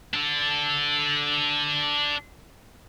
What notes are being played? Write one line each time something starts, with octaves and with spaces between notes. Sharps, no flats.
D4 A4